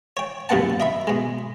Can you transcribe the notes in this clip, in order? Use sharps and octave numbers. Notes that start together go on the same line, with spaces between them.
C#5 G5
C2 F#2 A#3 B3 F#5 A5
D#5 E5 B5
B2 G#3